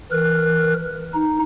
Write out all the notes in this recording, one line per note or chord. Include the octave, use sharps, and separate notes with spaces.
E3 A#4 F#6
D#4